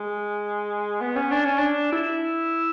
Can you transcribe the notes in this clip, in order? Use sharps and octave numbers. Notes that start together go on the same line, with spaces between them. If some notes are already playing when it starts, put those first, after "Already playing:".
Already playing: G#3
B3
C#4
D4
C#4
D4
E4